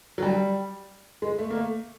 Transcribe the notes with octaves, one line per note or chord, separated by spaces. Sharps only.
F#3
G3
G#3
A3
A#3
A3